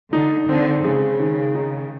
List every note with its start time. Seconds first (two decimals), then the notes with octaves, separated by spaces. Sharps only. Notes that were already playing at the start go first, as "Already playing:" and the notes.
0.13 D3 D#4
0.49 D3 C4
0.84 C#3 G#3
1.20 D#3
1.55 D#4